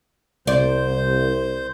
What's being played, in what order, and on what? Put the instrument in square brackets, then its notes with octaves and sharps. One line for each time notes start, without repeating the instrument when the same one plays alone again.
[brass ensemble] C2 [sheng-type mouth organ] C5 [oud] D5